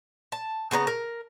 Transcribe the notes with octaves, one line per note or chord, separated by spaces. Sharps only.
A5
C#3 B3 C5 A#5
A#4